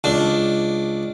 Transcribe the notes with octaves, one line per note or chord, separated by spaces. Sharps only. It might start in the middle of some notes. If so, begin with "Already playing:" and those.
C#2 D4